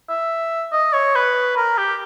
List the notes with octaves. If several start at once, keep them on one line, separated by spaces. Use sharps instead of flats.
E5
D#5
C#5
B4
A#4
G4